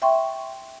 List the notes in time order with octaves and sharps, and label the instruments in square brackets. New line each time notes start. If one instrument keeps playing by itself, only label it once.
[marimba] E5 G5 C6 C#6